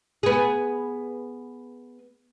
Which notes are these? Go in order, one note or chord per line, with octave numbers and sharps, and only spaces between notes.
B3 G#4